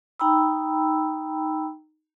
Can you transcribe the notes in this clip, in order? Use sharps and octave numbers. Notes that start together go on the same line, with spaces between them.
D#4 G5 A#5 B5 E6